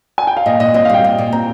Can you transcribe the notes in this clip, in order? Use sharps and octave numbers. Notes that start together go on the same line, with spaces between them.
G#5
G5
F5
A#2 D#5
A#2 D#5
C4 D#5
F5
G3 G5
A#2
A#2
C4 A#5